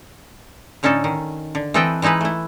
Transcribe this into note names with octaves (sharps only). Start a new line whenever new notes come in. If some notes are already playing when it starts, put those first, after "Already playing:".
A2 D3 C#4 D#4 A4
D#3
D3
E3 C4 A4 B4 D#5 G5
E3 G#3 D#4 E4 B4
A3 E4